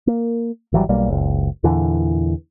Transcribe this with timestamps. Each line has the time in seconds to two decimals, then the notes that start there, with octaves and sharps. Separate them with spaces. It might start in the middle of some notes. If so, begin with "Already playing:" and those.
0.07 A#3
0.73 G#1 E3 F#3 G3
0.89 B1 G3 A#3
1.09 F#1 C#2
1.64 E2 A#2 D3 E3